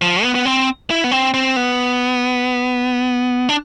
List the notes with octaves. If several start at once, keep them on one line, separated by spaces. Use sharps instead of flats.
F3
B3
B3
C4
E4
B3
C4
C4
B3
D4